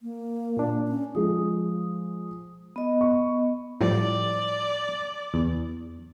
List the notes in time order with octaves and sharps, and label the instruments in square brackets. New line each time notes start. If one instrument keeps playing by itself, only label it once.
[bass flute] A#3
[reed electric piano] A#2 D4
[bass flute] C#4
[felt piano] F3 G#3 [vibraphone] D#6
[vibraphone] B3 D#5
[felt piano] C#6
[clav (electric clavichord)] A2 F3 G3 [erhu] D5
[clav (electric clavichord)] E2